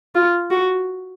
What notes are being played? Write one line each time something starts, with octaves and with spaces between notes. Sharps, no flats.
F4
F#4